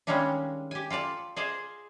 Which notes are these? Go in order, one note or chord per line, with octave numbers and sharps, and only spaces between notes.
D#3 G3 G#3 A#3 C#4 D4
G4 G#5
F4 A4 D5 A5
G#4 C5 D5 D#5 F5 G#5